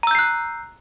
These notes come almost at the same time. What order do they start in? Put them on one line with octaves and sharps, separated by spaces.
A#5 E6 G6 C7 F#6